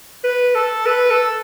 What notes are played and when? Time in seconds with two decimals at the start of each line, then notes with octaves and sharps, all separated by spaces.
0.24 B4
0.55 A4
0.86 B4
1.10 A4